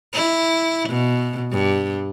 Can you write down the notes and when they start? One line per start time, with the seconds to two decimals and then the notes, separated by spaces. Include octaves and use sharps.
0.13 E4
0.89 B2
1.52 G2